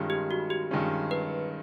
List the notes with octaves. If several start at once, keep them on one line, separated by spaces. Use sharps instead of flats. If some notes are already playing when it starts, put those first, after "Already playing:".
Already playing: G2 D#3 G#3 C#4 F4
G4
F#4
G4
G2 D#3 G#3 C#4 F4
B4